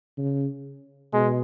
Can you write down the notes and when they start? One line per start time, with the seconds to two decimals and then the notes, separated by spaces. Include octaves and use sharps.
0.18 C#3
1.13 B2 G#3